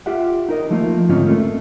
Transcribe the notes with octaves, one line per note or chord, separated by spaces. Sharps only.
F4 G4 E5 F#5
D#4 A#4 D#5
F3 A3 A#3 F4
G#2 D3 C4 C#4 F4 D#5
A3 A#3